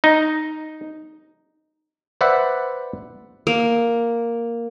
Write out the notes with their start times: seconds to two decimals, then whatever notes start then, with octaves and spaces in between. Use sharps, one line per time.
0.04 D#4
2.21 B4 C5 D5 E5 F#5
3.47 A#3